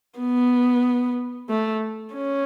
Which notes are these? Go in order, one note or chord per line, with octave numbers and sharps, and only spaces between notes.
B3
A3
C#4